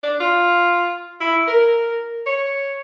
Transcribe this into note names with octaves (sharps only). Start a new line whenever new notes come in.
D4
F4
E4
A#4
C#5